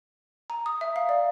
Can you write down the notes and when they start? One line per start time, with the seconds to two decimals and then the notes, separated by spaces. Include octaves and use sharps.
0.50 A#5
0.66 D#6
0.81 E5
0.96 F5
1.09 D5